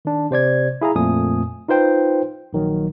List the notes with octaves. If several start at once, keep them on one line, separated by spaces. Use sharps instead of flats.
D#3 D4
C3 C5 D5 G#6
E4 G#4 F5 A#5
F2 A#2 A3 G#5 D#6
D#4 F4 B4 C5 G5
A#1 D#3 F#3